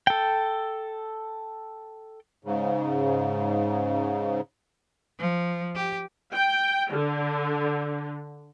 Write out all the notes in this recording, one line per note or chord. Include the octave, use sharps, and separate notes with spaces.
A4 G5
G#2 C#3
F3
G4
G5
D3